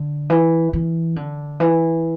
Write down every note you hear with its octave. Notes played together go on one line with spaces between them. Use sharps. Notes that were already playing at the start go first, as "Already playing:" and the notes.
Already playing: D3
E3
E3
D3
E3